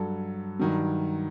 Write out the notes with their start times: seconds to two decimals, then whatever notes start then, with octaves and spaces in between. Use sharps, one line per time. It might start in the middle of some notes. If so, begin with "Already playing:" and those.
Already playing: G2 F#3 A4
0.59 G2 D#3 F#3